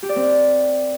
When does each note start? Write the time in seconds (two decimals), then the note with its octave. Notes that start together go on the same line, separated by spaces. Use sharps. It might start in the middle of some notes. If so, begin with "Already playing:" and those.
0.03 G4
0.09 D5
0.16 C4